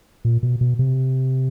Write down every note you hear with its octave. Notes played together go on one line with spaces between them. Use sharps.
A#2
B2
B2
C3